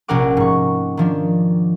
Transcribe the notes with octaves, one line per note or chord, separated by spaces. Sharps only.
A#1 C3 C#4 A#4 F#5 D6
G#2 C#6
D#3 F3 D4